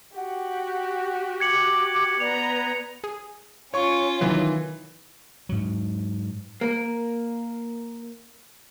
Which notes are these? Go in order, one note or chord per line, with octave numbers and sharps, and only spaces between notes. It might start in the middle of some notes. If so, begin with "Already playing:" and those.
F#4 G4 F#5
D6 G#6 C#7 F#7
B3 D5 A#5 F7
G#4
C#4 F4 C#5 C#6
C3 D#3 E3 F#3 B3
G#2 F#3
A#3 A#4